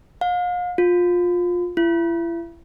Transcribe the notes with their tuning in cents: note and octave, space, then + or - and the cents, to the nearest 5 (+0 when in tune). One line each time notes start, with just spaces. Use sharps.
F5 +40
F4 +20
E4 +35